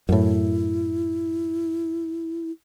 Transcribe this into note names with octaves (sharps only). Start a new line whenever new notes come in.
F#2 A2 E4